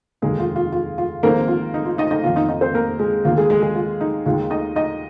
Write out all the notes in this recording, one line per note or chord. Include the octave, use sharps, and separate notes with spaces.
F1 D#2 D#3 G#3 A#3 G#4
F4
F4
F4
F4
G#1 G#2 F3 A#3 C4 A#4
F4
D#4
F4
D#4 D#5
D#4 D#5
F2 D#3 A#3 F4 F5
D#4 D#5
D#4 D#5
C4 C5
A#3 A#4
G#3 G#4
D#2 D#3 A#3 F4
G#3 G#4
G#3 G#4
G#3 G#4
F4
D#4
D#2 D#3 G#3 F4
D#4 D#5
D#4 D#5